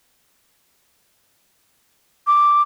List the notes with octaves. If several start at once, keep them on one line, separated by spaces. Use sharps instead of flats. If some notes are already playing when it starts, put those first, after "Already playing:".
D6